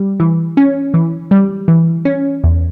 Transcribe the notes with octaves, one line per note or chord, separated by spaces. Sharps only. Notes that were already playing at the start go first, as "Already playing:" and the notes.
Already playing: G3
E3
C#4
E3
G3
E3
C#4
E2